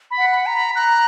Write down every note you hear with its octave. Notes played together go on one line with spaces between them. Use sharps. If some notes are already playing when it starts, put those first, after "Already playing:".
B5
F#5
B5
A#5
B5
A#5 F#6